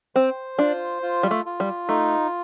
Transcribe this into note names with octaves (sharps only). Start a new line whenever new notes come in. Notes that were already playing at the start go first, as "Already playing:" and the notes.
C4 C5
D4 F4
F4
G3
A3
F4
G3
A3 D#4